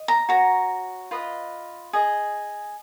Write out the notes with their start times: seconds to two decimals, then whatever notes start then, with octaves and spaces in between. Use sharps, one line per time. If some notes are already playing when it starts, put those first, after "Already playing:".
Already playing: D#5
0.08 A#5
0.29 F#4 C#5 A#5
1.11 F4 B4 D#5
1.93 G#4 D#5